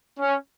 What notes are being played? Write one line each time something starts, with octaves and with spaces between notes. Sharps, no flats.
C#4